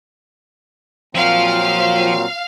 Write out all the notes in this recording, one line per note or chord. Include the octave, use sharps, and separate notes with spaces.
A#2 F3 F#3 C4 F5